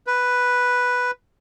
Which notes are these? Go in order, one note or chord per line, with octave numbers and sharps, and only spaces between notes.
B4